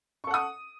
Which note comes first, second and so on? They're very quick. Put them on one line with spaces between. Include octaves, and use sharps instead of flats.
C#6 A4 F#5 D#6